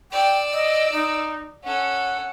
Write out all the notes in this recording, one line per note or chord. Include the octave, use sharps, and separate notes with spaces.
D5 G5 E6
D#5
D#4
C#4 A4 F#5